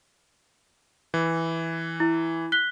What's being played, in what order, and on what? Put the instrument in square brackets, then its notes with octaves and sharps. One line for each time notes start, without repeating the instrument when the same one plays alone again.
[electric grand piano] E3
[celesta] E4
F#6 B6 G7